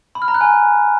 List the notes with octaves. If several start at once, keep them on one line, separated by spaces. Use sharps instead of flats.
B5
F6
A#5
F#6
G#5